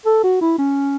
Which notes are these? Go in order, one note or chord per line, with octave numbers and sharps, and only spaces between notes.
A4
F#4
E4
C#4